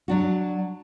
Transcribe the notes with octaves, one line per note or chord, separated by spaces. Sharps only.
F#3 D4 F#4